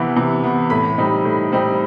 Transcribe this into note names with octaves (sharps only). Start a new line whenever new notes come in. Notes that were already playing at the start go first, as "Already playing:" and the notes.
Already playing: C3 E3 B3
C3
E3 B3
A2 B5
G3 C4 D#4
A2
G3 C4 D#4